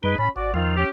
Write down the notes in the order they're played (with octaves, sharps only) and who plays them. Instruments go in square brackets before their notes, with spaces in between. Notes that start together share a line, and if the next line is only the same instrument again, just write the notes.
[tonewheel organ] F#2 G3 [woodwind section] D#4 G#4 B4
[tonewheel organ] A2 [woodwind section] C#4 B5
[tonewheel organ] G#1 [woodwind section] F#4 D5
[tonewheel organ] E2 F3 [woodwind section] D#3 D#4 F4
[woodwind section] C#4 G4